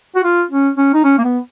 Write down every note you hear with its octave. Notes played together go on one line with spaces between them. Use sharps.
F#4
F4
C#4
C#4
D#4
C#4
A#3
B3